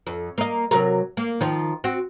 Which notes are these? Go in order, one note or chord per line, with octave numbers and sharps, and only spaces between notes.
F2
A#3 D#5
C3 F#3 A#4
A#3
D#3 F3
C4 F#4